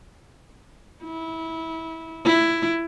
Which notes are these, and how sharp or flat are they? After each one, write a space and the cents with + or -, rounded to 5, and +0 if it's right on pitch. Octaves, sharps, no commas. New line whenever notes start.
E4 -20
E4 +10